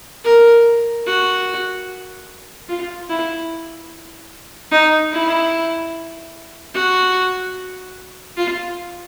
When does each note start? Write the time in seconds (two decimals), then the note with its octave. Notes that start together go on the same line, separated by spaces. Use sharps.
0.25 A#4
1.07 F#4
2.69 F4
3.09 E4
4.71 D#4
5.12 E4
6.74 F#4
8.37 F4